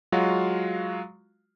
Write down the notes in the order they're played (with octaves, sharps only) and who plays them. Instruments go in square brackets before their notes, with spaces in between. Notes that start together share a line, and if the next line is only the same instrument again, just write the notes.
[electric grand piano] F#3 G#3 F4 F#4 F5